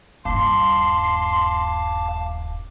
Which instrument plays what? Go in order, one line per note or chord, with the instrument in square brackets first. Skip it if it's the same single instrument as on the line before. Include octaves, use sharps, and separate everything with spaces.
[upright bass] D#1 G2 [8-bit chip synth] F5 A5 D6 [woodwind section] C6